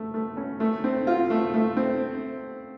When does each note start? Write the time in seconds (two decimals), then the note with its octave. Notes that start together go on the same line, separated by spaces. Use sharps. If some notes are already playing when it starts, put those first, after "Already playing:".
Already playing: A3
0.14 A3
0.37 C#4
0.60 A3
0.84 C4
1.07 F4
1.30 A3
1.54 A3
1.77 C4